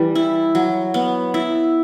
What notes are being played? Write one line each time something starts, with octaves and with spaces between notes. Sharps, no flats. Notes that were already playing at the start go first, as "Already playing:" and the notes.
Already playing: E3 G3
E4
F#3
B3
E4